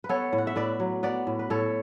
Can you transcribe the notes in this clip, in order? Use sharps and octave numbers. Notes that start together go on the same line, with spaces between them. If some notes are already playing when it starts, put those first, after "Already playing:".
B4
B3 A4 C#5
A2
F#5
E5
A2 B4 D5
F#3
B3 B4 D5
A2
B4
A2 A4 C#5